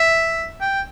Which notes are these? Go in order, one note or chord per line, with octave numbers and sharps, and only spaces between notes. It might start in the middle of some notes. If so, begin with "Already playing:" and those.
Already playing: E5
G5